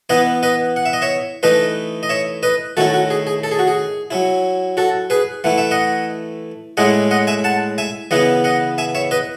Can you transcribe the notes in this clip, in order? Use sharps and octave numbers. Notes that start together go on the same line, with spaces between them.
E3 B3 E4 B4 D#5
B4 D#5
F#5
E5
D#5
C#5 E5
E3 A3 D#4 B4 D#5
D#5
C#5 E5
B4 D#5
D#3 A3 C#4 E4 F#4 A4
F#4
G#4
G#4
A4
G#4
F#4
G#4
F#3 C#4 E4
F#4 A4
G#4 B4
E3 A3 E4 F#5
E5
D#5 F#5
A2 G#3 C#4 E4 D#5 F#5
D#5 F#5
E5 G#5
F#5 A5
E5 G#5
C#3 E3 B3 E4 D#5 F#5
D#5 F#5
E5 G#5
C#5 E5
B4 D#5